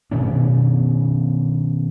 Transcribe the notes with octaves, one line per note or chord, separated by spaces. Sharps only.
B2 D#3 C#4 D4